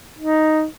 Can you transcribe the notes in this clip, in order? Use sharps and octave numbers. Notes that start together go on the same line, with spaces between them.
D#4